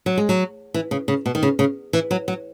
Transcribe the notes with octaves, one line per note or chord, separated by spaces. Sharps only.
F#3
G#3
F#3
E3
C#3
C#3
B2
D#3
C#3
C#3
E3
F#3
F#3